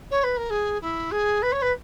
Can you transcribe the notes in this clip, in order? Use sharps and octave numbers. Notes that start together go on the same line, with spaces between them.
C#5
B4
A#4
G#4
E4
G#4
B4
C#5
B4